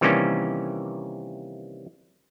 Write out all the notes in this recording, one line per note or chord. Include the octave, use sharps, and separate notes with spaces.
C3 D#3 E3 G3 A#3 C#4